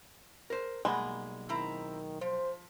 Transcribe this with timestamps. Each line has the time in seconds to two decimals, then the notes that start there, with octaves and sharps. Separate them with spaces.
0.50 A#4 C5
0.85 B1 G3 G#3 A#3 F#5
1.49 D#3 C4 E4 A#5
2.21 F3 C5